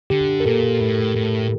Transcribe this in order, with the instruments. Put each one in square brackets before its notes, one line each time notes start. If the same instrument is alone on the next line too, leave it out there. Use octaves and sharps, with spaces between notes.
[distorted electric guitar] D3 [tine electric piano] G4
[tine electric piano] A#4
[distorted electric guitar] A#2 [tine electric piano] A4
[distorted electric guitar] A2
A2